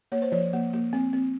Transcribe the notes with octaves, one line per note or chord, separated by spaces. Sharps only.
A#3 C#5
C5
F3 C#5
A#3
A#3
C4
C4